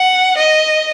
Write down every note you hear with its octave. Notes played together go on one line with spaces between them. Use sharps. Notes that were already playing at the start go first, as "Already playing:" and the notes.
Already playing: F#5
D#5